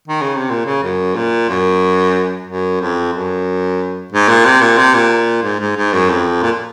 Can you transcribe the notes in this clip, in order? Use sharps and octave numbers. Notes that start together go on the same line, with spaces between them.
D#3
C#3
C3
A#2
C#3
F#2
A#2
F#2
F#2
F2
F#2
G#2
A#2
C3
A#2
C3
A#2
G#2
G#2
G#2
F#2
F2
A#2